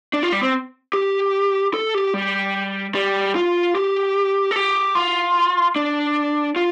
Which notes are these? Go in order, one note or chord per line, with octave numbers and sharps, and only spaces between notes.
D4
F4
G3
C4
G4
A4
G4
G3
G3
F4
G4
A4
G4
F4
D4
F4